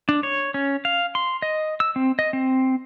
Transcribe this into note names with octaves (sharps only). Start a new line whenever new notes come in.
D4
C#5
C#4
F5
C6
D#5
E6
C4
D#5
C4